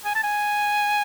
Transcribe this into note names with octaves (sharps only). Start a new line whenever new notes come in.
G#5
A5
G#5